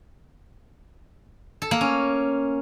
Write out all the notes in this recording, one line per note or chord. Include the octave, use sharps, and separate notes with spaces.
A4
A#3
C#4